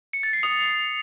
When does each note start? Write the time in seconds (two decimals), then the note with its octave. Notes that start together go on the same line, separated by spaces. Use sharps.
0.13 C#7
0.23 A6
0.33 C7
0.43 D#6